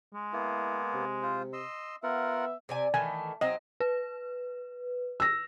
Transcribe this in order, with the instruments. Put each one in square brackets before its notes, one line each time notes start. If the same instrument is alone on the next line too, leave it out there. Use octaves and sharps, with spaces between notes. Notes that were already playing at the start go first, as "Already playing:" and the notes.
[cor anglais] G#3
[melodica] A#3 B3 [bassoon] E4
[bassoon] C3
[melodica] F4 C5
D#5 C6 E6
[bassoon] B3 [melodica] F4 A#4 F#5 [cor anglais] E5
[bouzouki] C3 D5 G#5
[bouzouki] D#3 E3 A3 [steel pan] G#5
[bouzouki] F#3 C4 [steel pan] D#5
[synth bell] B4
[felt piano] E6 A#6